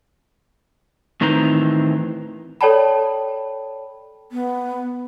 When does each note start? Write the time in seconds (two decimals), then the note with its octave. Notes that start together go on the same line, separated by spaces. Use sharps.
1.21 A2 D#3 E3 C4 A#5
2.61 A4 C#5 D5 G5 A5 B5
4.32 B3